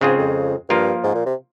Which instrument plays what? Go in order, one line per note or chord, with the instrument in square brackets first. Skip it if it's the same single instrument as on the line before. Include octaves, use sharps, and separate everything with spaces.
[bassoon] G#2 [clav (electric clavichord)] C#3 G#3 C4 F4 G#4
[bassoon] F2
[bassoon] G2 [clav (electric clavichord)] F3 A#3 F4 A#4
[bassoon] G#2
A#2
C3